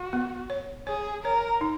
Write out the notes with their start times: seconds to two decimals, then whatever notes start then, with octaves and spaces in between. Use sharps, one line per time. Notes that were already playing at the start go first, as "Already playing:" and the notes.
Already playing: F#4
0.13 B3
0.50 C#5
0.87 G#4 C#5
1.24 A#4 C#5
1.61 D#4